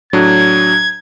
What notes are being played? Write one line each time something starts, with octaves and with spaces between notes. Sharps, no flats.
A2 F#3 D4 G#6